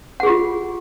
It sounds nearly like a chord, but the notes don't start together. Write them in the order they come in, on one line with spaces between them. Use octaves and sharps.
F#5 G#4 G4 F4